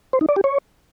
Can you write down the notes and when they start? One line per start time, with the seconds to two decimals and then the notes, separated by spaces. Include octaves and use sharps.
0.13 C5
0.21 D#4
0.29 D5
0.36 G4
0.44 C#5